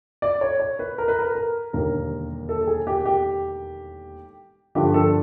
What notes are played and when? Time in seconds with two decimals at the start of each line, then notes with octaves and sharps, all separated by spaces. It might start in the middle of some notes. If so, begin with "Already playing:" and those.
0.22 D5
0.41 C#5
0.60 C#5
0.79 B4
0.98 A#4
1.08 B4
1.19 A#4
1.35 A#4
1.73 E1 D#2 D3 G3 A#3 A#4
2.49 A4
2.61 A4
2.67 G#4
2.87 G4
3.05 G4
4.75 G2 D3 F3 G4
4.94 A4